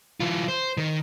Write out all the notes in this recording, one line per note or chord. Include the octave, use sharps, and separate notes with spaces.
E3 F4
C5
D#3